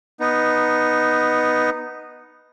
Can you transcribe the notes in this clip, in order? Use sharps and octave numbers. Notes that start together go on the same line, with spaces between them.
B3 D#4